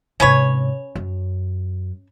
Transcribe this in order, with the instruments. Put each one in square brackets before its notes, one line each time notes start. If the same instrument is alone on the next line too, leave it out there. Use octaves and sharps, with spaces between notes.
[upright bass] G#2 C3 [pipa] C#4 B4 C#5
[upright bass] F#2